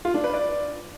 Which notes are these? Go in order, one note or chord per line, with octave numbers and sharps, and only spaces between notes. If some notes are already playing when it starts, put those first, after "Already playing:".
F4
D4
B4
D5